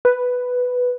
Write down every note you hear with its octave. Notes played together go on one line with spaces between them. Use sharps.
B4